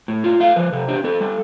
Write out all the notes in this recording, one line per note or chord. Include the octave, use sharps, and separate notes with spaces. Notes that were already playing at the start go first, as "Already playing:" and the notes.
A2
F4
A3 F5
F3 B4
C3 A4
D4 G4
C4 A4
G3